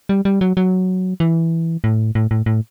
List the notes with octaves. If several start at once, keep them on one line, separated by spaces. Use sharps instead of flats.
G3
G3
F#3
F#3
E3
A2
A2
A2
A2